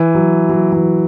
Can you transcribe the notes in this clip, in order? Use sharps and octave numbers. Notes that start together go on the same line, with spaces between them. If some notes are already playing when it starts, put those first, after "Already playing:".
Already playing: E3
F#3
F#3
E3